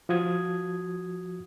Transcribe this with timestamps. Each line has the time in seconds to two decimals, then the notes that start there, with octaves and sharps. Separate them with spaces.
0.09 F3 F4 F#4 D#6 G#6